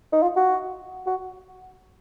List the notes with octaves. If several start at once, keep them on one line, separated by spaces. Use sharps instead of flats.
D#4
F4
F#4
F#4